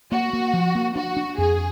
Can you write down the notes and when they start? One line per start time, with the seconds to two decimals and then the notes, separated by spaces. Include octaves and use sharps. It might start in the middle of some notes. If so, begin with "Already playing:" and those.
0.11 A#3 F#4
0.33 A#3
0.54 F3
0.75 A#3
0.96 D4 F#4
1.17 D4
1.38 F2 G#4